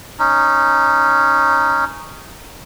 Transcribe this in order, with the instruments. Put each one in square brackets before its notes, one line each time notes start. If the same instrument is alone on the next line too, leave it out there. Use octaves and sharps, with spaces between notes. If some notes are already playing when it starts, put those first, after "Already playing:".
[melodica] C#4 D#4